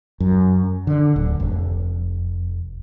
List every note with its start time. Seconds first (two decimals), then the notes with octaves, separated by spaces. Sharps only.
0.20 F#2
0.87 D3
1.16 D1
1.40 F1